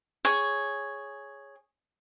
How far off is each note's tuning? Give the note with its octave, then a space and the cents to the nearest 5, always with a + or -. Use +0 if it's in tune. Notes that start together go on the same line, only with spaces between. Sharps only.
G#4 +0 C#5 +0